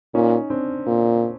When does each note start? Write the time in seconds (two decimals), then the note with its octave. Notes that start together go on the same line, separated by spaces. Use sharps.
0.15 A#2 C#4 D#4
0.50 C4 D4
0.87 A#2